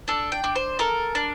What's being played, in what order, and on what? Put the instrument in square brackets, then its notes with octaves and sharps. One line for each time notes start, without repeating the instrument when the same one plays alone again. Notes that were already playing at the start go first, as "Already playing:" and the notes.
[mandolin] D4 A4
G5
D4
C5
A4 A#4
D4